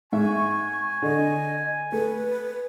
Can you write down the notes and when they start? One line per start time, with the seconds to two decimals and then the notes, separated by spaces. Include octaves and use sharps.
0.12 G#2 E5 G#5 C#6
1.02 D3 D#5
1.92 A3 B4